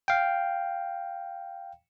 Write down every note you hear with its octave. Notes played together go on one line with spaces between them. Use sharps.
F5 G5